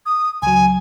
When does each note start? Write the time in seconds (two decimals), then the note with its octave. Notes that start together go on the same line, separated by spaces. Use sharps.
0.06 D#6
0.42 C#2 F#3 G#5